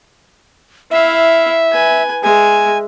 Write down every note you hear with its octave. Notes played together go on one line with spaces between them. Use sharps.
E4 E5 F5
B4 G#5
G#3 E5 G#5